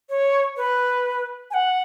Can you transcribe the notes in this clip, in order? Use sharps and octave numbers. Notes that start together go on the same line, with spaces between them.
C#5
B4
G#5
F#5